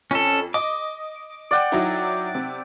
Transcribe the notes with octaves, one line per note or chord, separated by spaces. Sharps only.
F2 C#4 A4
D#5 D6
D5 F#5 G5
F#3 D#4 E4
C3